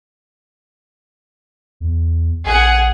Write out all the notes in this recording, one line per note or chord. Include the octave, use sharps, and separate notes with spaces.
E2
A#1 G#4 F#5